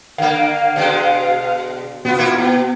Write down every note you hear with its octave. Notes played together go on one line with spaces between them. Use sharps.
D3 A#3 F5
B2 D3 G#3
B2 B3 F4
A#3 E4 F4
B2 B3